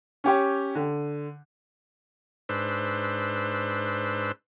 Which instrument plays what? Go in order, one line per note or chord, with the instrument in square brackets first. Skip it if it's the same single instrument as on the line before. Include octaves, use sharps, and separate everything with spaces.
[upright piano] C#4 G4 C#5
D3
[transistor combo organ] G#2 D4 B4 C5 E6